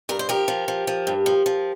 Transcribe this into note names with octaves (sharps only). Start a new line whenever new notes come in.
G2 A#4
C5
F3 G4 A#4
F3
F3
F3
G2
F3
F3